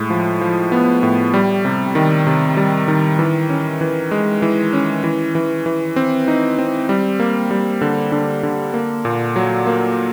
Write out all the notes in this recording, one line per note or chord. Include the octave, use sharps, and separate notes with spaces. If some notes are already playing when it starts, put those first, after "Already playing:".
Already playing: A2 G#3
F3
F3
B3
A2
G3
C3
D#3
C3
G3
D#3
E3
C#4
E3
G#3
E3
C#4
E3
E3
E3
C4
D#4
C4
G3
A#3
G3
D3
D3
D3
A#3
A#2
F#3
A#3